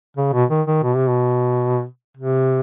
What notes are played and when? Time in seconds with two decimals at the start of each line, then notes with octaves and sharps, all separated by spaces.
0.17 C#3
0.33 B2
0.50 D#3
0.67 D#3
0.84 B2
0.96 C3
1.08 B2
2.17 C3